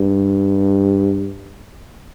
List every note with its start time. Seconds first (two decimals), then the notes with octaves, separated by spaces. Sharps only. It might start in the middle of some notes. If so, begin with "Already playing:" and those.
Already playing: G2